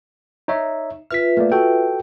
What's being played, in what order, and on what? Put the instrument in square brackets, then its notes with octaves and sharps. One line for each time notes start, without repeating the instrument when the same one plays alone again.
[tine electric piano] D#4 C#5 E5
[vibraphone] F4 B4 E5 [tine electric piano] F6 B6
[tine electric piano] A3 A#3 D5
F#4 A4 G5